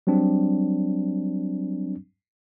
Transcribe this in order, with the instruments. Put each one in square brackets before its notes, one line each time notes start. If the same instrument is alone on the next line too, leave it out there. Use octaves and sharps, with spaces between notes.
[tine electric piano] F#3 G3 C4 D4